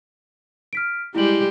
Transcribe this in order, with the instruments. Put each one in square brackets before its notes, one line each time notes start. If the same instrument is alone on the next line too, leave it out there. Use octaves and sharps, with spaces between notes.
[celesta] F6 B6 D7
[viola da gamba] G3 G#3 G4 [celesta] E4 F#7